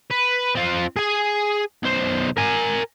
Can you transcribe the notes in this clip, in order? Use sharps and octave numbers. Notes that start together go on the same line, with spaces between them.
B4
C4 F4
G#4 G#5
B1 C5
A#4 G#5